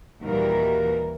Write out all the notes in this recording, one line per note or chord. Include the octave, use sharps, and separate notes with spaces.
D#2 A#2 E3 G3 F#4 A#4